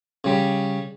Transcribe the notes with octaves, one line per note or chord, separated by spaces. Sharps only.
C#3 G3